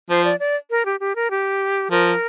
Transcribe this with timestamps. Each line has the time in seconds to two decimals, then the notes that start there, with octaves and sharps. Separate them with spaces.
0.09 F3 C5
0.24 D5
0.40 D5
0.70 A#4
0.86 G4
1.00 G4
1.16 A#4
1.31 G4
1.91 F3 A#4